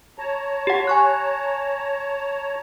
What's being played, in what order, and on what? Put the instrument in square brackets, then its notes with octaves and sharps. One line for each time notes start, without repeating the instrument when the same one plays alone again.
[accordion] C#5 A5 A#5
[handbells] G4 F#5
G#5 C#6 F#6